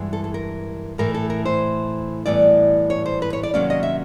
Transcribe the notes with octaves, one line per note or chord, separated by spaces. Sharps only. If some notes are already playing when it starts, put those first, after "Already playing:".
Already playing: G2 E3 G#3 B3
A4
A4
A#4
A2 E3 A3 A#4
A4
A#4
C5
A2 E3 G3 B3 D5
C#5
C5
B4
C#5
D5
C3 D#3 F#3 A#3 C#4 D5
D#5
E5